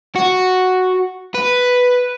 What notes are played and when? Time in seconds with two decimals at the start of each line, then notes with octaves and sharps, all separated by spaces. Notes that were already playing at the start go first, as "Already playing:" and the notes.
0.16 F#4
1.35 B4